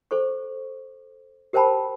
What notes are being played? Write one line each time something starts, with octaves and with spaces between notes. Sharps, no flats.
A4 C5 C#6
G4 A#4 C5 G5 A5 B5